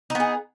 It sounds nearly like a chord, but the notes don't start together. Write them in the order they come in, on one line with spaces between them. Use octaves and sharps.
D#4 B3 G#4